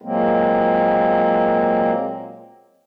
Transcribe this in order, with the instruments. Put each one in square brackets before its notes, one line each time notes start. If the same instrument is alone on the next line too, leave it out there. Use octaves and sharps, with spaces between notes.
[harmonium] A#2 F#3 G#3 A#3 C4